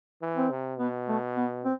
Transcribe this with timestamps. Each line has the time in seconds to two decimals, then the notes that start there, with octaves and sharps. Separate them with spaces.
0.22 E3
0.36 C4
0.50 C3
0.79 B2 B3
1.08 A3
1.36 B3
1.64 C4